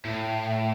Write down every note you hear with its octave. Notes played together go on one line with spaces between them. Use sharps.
A2